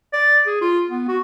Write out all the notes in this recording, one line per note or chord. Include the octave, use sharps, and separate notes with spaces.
D5
G#4
F4
B3
F#4